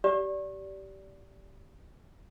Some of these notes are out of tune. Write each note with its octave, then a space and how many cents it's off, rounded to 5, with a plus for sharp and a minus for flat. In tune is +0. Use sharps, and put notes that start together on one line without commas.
G4 -20 D5 -20